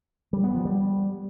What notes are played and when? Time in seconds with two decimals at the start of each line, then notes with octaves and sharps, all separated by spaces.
0.33 G3
0.44 B3
0.54 F3
0.65 G3